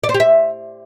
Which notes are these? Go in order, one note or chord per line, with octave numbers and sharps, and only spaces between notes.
D5
C5
G4
E5